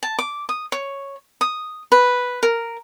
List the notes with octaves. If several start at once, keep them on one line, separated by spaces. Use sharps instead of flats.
A5
D6
D#6
C#5
D#6
B4
A#4